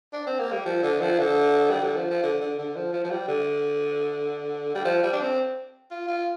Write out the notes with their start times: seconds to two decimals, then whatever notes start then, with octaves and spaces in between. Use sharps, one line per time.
0.13 D4
0.26 C4
0.39 A#3
0.52 G3
0.66 F3
0.83 D3
1.01 F3
1.19 D3
1.70 G3
1.83 D3
1.96 F3
2.10 F3
2.23 D3
2.40 D3
2.59 D3
2.76 F3
2.93 F3
3.04 F3
3.10 G3
3.28 D3
4.75 G3
4.85 F3
5.03 G3
5.13 D4
5.21 C4
5.91 F4
6.08 F4